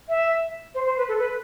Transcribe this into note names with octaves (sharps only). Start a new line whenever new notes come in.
E5
C5
C5
B4
A4
B4